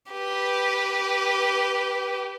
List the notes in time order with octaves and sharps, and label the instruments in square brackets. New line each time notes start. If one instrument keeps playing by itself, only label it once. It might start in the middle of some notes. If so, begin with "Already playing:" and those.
[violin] G4 B4